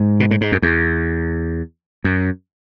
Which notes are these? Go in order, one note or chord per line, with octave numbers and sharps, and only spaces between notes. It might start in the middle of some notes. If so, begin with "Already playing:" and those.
Already playing: G#2
B2
A2
G#2
F#2
E2
F#2